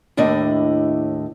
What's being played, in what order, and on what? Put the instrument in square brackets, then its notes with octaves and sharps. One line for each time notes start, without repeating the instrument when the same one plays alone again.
[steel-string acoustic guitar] D#2 A2 D4 E4 D#5